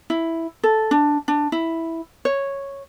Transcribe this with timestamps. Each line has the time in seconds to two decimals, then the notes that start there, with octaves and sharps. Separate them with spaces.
0.10 E4
0.63 A4
0.91 D4
1.28 D4
1.52 E4
2.25 C#5